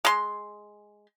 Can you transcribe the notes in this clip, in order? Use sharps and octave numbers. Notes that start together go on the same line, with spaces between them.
G#3 C6